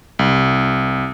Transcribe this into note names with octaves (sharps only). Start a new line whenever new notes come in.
C2